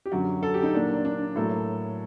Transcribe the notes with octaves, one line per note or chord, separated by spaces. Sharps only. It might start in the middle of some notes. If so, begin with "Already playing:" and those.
G4
F#2 D3 F#3 F#4
A4
G4
D#4
A#2 F#3 A#3 D4
D4
D4
A2 F#3 A#3 A4